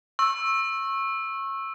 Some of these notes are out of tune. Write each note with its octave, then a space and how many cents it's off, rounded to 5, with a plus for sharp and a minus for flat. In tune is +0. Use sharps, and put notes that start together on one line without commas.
C#6 -25 E6 +0